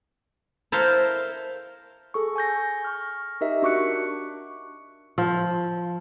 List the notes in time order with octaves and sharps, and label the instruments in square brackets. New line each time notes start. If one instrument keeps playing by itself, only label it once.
[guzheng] E4 A4 A#4 C5 F5
[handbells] G#4 A4 C#6
G#5 C#6 G6 A#6
C#6 F6
D#4 G4 A#4 D#5 E5
D4 F#4 C#6 D6 F#6 C#7
[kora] F3